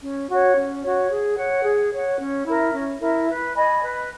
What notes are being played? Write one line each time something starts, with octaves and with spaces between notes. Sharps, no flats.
C#4
F#4 C#5
C#4
F#4 C#5
G#4
C#5 F#5
G#4
C#5 F#5
C#4
E4 A#4 E5
C#4
E4 A#4 E5
B4
D#5 G#5 B5
B4